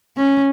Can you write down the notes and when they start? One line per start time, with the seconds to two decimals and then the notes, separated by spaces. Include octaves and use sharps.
0.17 C#4